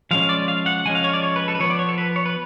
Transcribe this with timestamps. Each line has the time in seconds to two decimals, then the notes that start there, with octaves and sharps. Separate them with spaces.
0.11 F3 G#3 C#4 F5
0.29 D5
0.48 F5
0.66 F#5
0.86 F3 G#3 C#4 G#5
0.95 F5
1.04 C#5
1.13 D5
1.23 C#5
1.36 B4
1.48 A4
1.55 B4
1.60 F3 B3 C#5
1.70 D5
1.79 C#5
1.89 A4
1.98 B4
2.16 C#5
2.26 B4